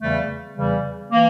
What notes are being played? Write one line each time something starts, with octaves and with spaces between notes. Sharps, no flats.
E2 C#3 E3 G3 A3
E2 C#3 E3 G3
E3 A#3